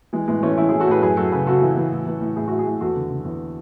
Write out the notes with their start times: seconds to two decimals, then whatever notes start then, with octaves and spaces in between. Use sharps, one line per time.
0.13 E3 G#3
0.28 A2 G#3 B3
0.43 E3 A3 C#4
0.58 E3 C#4 E4
0.69 E3 E4 G#4
0.80 F#4 A4
0.88 A2 G#4 B4
1.02 F#2 G#4 B4
1.17 F#2 F#4 A4
1.32 C#3 G#4 B4
1.47 C#3 F#4 A4
1.62 E3
1.77 E3
1.92 A2
2.06 E3
2.21 A2
2.36 A2 G#4
2.48 A2 F#4
2.59 E4 G#4
2.66 A2
2.81 E2 F#4 A4
2.95 D3
3.11 D3
3.25 E2